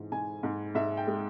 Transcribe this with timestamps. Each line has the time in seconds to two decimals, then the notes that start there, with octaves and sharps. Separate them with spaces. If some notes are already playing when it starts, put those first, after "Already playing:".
Already playing: G#2 E3
0.12 G#2 G#5
0.43 G#2
0.75 G#2 E5
0.97 G5
1.07 G#3